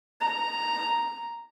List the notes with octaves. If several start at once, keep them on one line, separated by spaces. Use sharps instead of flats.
A#5